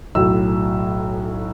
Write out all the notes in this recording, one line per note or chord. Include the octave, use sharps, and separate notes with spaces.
B1 A2 F#3 E6